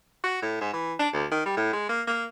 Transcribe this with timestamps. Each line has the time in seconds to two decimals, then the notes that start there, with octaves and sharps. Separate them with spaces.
0.24 F#4
0.42 A2
0.61 G#2
0.73 E3
0.99 D4
1.13 D2
1.32 D#3
1.45 G3
1.57 A2
1.73 G#3
1.89 A#3
2.07 A#3